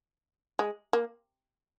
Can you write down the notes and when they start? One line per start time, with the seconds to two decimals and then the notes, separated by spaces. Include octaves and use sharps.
0.59 G#3
0.93 A#3